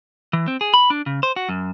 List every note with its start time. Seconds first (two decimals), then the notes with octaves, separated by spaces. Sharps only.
0.33 E3
0.48 C4
0.61 G#4
0.74 B5
0.90 D4
1.06 C#3
1.23 C5
1.36 F#4
1.49 F#2